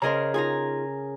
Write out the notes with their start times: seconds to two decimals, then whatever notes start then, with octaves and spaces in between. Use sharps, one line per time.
0.02 C#3 G#4 A#4 C5 D#5 A#5
0.34 D#4 F4 G#4 G#5 A#5